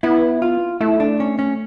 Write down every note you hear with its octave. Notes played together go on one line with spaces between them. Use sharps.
B3 E4
F4
A3 E4
D4
C#4
C#4